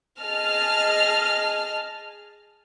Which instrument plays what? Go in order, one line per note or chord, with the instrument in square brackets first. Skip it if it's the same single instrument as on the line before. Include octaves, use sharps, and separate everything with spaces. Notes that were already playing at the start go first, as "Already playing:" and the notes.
[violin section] G#4 D#5 A5 F6